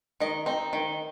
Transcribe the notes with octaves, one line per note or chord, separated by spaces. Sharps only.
D#3 D#5
C4 D#4
D#3